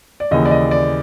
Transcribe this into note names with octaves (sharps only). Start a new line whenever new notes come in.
D5
D#2 C#3 E3 D#5
D5
D#5
D5